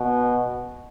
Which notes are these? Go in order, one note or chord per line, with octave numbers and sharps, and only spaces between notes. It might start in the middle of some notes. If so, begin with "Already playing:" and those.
Already playing: B2